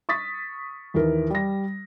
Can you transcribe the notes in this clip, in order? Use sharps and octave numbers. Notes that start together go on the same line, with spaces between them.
C#6 D#6 A6 B6
D#2 E3 A#4
G3 A#6